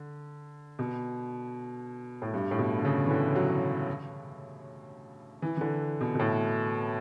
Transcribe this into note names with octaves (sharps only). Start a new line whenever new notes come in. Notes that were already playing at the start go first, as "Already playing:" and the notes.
Already playing: D3
B2
A2
G2
A2
B2
D3
C#3
E3
D3
F#3
E3
E3
D3
B2
B2
A2